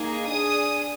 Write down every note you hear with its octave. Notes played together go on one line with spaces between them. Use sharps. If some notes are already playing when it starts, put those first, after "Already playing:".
Already playing: A#3 D#4 G#4
D4 G#4 D#6